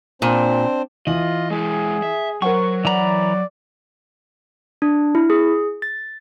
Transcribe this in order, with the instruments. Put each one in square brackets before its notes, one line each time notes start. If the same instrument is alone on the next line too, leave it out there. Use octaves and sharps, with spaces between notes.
[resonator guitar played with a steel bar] A#2 [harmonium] C4 D4 C5
[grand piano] E3 F#7 [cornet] F4 [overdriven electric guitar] D#5
[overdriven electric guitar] G#3 E4 [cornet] G#4
[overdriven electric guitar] E5
[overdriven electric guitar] F#3 [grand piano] A#4 C5 F#5 [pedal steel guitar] C#6
[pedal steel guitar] E3 A#5 B5 [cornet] D5
[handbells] D4
E4
G#4
A6